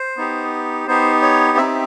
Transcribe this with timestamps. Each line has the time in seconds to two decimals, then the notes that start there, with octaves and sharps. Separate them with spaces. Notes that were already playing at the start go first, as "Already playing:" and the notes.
Already playing: C5
0.17 B3 D#4 G4
0.87 B3 D#4 G4 C5
1.22 C#5
1.57 C4 D#4 G4 E5